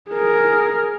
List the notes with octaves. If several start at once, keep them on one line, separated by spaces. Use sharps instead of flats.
G#4 A#4